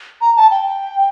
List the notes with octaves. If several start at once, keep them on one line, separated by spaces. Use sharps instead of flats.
A#5
A5
G5